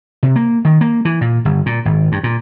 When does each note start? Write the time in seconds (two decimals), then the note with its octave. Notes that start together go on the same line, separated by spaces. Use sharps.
0.23 C3
0.36 A#3
0.65 D#3
0.81 A#3
1.05 E3
1.21 A#2
1.45 G1
1.66 A#2
1.85 G#1
2.12 G2
2.23 A#2